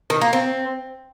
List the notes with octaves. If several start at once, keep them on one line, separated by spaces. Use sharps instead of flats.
D#3
A#3
C4